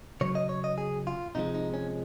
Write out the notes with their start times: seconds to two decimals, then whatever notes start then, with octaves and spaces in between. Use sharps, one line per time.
0.21 C#3 F#3 C#5
0.35 D#5
0.49 C#5
0.64 D#5
0.78 G#4
1.07 F4
1.35 C3 F3 G#3 D#4
1.54 D#4
1.74 C#4